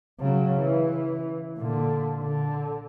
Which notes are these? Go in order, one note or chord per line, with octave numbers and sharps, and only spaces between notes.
C#3 F#3
E3
A#2 D3
D3